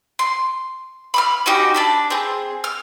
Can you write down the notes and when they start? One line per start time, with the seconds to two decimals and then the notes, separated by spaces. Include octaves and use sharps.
0.19 C6
1.14 B5 D6 F6
1.46 C#4 D#4 F#4 G4
1.74 D4 A5 B5
2.10 C4 G#4
2.64 F6